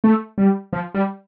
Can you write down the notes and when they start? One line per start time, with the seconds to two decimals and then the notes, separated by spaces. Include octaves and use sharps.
0.04 A3
0.38 G3
0.73 F3
0.94 G3